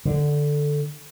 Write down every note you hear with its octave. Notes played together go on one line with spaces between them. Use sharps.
D3